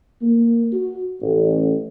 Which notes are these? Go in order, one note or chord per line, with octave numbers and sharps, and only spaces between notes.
A#3
F#4
A1